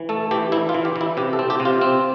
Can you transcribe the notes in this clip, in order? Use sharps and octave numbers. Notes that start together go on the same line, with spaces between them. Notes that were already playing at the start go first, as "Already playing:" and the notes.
Already playing: E3
A3 A4
E3 G4
E3 E4
F4
E3
G4
E3
E4
C3 G4
A4
C4
G4
C3
F4
C4